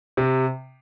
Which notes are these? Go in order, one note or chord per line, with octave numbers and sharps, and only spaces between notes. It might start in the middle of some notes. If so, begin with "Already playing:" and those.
C3